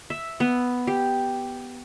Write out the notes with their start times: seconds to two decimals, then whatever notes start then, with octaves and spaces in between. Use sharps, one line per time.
0.10 E5
0.40 B3
0.87 G4